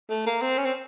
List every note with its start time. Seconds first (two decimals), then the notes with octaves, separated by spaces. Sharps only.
0.10 A3
0.26 A#3
0.42 C4
0.58 C#4
0.65 C4